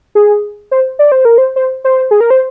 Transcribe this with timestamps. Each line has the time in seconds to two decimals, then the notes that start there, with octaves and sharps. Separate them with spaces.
0.15 G#4
0.71 C5
0.99 D5
1.12 C5
1.25 A#4
1.38 C5
1.56 C5
1.84 C5
2.11 G#4
2.21 A#4
2.30 C5